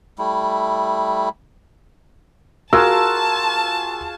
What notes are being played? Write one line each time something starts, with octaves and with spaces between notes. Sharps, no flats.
G3 A3 E4
F4 F#4 G#4 A#4 A5 C6 E6